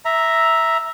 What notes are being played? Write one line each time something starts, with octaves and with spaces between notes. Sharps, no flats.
E5 A#5